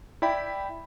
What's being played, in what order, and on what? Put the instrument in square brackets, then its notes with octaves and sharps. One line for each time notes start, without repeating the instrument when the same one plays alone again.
[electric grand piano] E4 D5 G5 B5